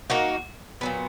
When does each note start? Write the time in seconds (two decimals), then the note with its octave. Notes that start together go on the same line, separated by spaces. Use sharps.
0.10 A#3 D#4 F#4
0.81 A#2 F#3 B3